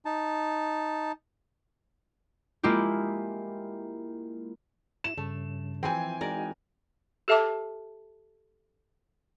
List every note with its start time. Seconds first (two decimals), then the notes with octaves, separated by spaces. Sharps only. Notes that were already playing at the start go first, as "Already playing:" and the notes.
0.05 D#4 A5
2.63 G#3 A#3 E4 F4 G4
5.04 E4 E7
5.17 G2 C#3 A3
5.83 E3 F3 C4 G5 G#5
6.21 G#3 D#4 F#4 A#4 D5
7.28 G4 A4 E5 A5 D6